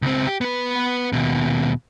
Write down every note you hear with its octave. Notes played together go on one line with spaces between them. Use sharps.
C#2 C4
G4
B3 B4
D#2 B2